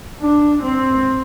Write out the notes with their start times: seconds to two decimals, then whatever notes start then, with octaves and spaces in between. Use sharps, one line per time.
0.22 D4
0.62 C4